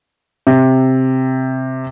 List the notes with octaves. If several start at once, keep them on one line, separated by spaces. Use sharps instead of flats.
C3